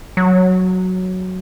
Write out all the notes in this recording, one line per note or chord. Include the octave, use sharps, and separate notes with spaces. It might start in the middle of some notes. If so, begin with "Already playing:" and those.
F#3